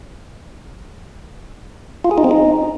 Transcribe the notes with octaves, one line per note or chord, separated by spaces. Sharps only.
F4
G#4
D#4
C4
D#4